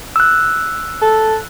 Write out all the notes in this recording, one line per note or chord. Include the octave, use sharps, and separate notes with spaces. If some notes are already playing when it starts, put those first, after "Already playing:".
E6 F#6
A4